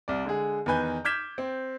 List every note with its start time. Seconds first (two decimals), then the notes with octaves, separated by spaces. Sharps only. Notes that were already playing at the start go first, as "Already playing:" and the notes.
0.08 C2 D5
0.25 D3 G#3 G#4
0.66 E2 D#3 B4 G#5 G6
1.05 D6 F6 G6 G#6 B6 E7
1.38 C4